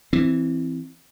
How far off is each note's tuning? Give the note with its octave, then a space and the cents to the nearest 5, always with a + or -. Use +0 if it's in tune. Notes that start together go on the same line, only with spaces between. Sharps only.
E3 +0 C4 +0